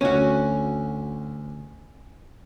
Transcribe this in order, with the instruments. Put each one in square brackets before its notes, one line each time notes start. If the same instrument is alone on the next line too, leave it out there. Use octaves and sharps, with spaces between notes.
[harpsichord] D2 [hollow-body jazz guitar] C#4 F#4